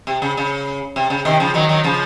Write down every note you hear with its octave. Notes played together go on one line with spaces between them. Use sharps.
C3
C#3
C#3
C3
C#3
C3 D#3
C#3 F3
D#3 F#3
D#3 F#3
C#3 F3